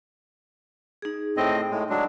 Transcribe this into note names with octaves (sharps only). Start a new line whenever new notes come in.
D#4 G#4
A2 C4 D#5
A2 G#3
F#3 G#3 D4